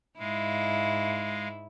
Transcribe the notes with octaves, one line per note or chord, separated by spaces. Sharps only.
G#2 G#3 E4 F5